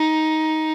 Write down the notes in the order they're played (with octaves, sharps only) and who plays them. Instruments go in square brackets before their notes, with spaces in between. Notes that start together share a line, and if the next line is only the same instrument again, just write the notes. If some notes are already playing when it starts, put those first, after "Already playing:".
Already playing: [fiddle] D#4